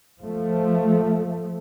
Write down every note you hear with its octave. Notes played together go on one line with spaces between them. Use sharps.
F3 A3